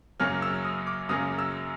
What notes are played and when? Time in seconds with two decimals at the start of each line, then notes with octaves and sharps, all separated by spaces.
0.20 F#2 C#3 F#3 A#3 C#4 F6
0.42 E6
0.64 D#6
0.87 D6
1.09 F#2 C#3 F#3 A#3 C#4 D#6
1.39 E6